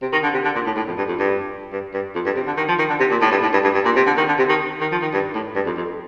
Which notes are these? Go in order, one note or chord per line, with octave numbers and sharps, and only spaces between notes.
C3
D#3
D3
C3
D3
A#2
A2
A2
F2
G2
F2
G2
G2
G2
F2
G2
C3
D3
D#3
F3
D#3
D3
C3
A#2
A2
G2
A2
G2
G2
G2
A#2
C3
D3
D#3
D3
C3
D#3
D#3
F3
D#3
G2
A2
G2
F2
F2